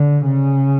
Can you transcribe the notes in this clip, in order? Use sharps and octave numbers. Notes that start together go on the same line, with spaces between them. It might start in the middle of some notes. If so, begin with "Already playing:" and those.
Already playing: D3
C#3